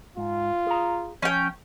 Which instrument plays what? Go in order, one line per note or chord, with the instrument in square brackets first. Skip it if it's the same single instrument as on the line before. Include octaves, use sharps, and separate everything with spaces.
[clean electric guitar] G#2 [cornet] F4
[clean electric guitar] G#4 A#5
[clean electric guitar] F3 [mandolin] C#4 G5